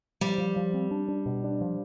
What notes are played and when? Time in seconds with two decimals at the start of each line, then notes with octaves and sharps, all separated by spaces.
0.21 F3 G3
0.38 F3
0.56 F3
0.74 C4
0.91 D4
1.09 D4
1.26 B2
1.44 D4
1.61 F3